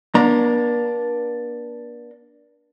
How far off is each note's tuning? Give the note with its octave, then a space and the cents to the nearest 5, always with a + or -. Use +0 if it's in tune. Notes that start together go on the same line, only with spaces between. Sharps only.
A#3 +45 D4 +0 A#5 +0